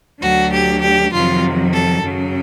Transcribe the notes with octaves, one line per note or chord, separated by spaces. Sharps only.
D2 D3 F#3 F#4
G4
G4
F2 C3 D#3 F#3 F4
A4
F#2 C#3 F#3